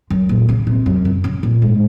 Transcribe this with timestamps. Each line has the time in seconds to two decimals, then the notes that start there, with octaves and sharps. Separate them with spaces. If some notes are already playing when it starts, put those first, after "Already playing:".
0.10 F#2
0.29 A#2
0.49 C#3
0.67 C3
0.86 F#2
1.05 C#3
1.24 C#3
1.43 A#2
1.62 G#2